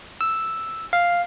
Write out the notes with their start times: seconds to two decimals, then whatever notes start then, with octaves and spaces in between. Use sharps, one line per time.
0.21 E6
0.93 F5